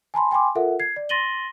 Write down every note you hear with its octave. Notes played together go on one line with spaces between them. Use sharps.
G#5 A5 B5 C6
G5 G#5 B5 C6 D6
F4 A4 A#4 E5 F#5
G#6 C7
D5
C6 A6 A#6 D#7 F#7 G7